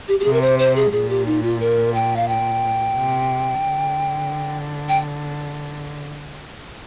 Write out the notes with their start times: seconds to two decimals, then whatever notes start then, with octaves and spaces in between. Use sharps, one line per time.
0.08 G4
0.20 G4
0.24 C3 G#4
0.33 A#4
0.41 C5
0.59 C5
0.76 G#4
0.92 A#2 G#4
1.09 G4
1.26 D#4
1.43 F4
1.60 A#4
1.94 G5
2.16 F5
2.28 G5
2.96 C3
3.63 D3
4.89 G5